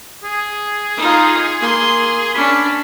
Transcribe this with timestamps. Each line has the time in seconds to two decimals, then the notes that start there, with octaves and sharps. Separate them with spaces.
0.24 G#4
0.97 D#4 F4
1.59 A#3 C6
2.35 C#4 D4 B5